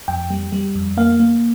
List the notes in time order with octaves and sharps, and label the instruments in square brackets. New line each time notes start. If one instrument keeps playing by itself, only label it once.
[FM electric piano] F2 G5
G3
G3
F2
A#3 F5
A#3